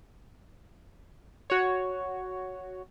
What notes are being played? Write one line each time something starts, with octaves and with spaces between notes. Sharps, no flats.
F#4 C#5